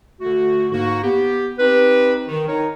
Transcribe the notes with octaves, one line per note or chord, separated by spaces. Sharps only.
D3 A3 F#4
G#2 A#3 D#4 F#4
B3 G4
C4 D#4 G4 B4
D#3
D#4 A#4 C#5